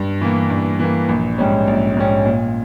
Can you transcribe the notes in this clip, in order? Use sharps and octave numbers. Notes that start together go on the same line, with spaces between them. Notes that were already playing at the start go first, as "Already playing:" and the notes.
Already playing: G2
E3 A#3
G2
E3 A#3
A#1
G#2 G3 C#4
A#1
G#2 G3 C#4
A#2